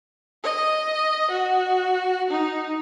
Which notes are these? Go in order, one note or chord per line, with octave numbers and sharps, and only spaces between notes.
D#5
F#4
D#4